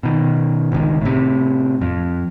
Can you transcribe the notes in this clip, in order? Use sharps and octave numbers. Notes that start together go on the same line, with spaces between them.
B2 D#3
G1 C#2 D3 D#3
A2 C3
F2